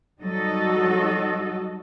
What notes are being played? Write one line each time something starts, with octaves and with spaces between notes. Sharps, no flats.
F#3 G3 D#4 F#4 A4 D#5